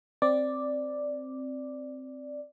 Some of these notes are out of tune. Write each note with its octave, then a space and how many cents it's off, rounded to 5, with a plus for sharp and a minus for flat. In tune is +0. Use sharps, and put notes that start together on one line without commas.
C4 +5 D5 +0